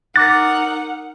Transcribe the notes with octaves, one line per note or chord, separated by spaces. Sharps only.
D#4 A#4 F#5 D6 F#6 A6